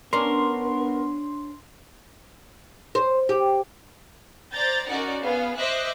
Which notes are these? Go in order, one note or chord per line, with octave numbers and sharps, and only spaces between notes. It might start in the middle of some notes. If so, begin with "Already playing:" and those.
B3 C#4 D4 A#4 C6
C5
G4
C5 D5 A#5 G6 A6
C#4 D#4 F#4 A#4 D5 F#5
B3 G#4 F5
C5 D#5 E5 D6 E6 F#6